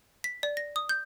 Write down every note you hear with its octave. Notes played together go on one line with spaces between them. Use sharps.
B6
D5
A#6
D#6
G6